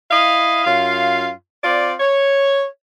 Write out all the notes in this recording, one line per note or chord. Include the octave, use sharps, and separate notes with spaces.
E4 D#5 F5
F#2 F4 F5
C4 F4 D5
C#5